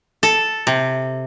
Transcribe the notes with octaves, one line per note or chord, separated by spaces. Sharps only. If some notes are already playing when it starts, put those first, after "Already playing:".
A4
C3